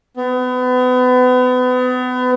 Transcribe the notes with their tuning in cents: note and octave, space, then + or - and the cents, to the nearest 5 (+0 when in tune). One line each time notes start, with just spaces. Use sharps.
B3 +35